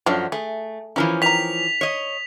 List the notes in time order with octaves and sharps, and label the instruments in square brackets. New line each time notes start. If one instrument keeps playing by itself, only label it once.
[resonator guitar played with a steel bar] F#2 F3 F#3 [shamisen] D3 D4 C#5
[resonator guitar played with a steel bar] A3 [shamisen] G#4
[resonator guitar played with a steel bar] E3 F3 C#4 [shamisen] E4 A#4
[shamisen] D#3 A#5 [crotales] B6 F7
[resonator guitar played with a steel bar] C#5 D#5